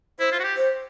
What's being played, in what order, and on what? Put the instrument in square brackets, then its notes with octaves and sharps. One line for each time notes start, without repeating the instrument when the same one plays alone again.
[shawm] E4 [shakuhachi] C5
[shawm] F4
F#4
G4
[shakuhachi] C5